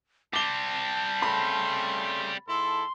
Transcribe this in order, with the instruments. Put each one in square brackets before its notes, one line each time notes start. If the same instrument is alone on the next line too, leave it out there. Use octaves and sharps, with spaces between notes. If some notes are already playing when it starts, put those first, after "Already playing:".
[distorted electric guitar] G3 C4 [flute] A5 [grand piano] D6 G7
[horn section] C#3 A3 C6 [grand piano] B5
[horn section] G#2 E4 A4 [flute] C6